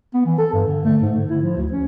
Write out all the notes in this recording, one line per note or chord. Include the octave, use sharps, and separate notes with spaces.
B3
E3
A4
G2
D3
A3
G#2
D3
E4
F3
D2
C#4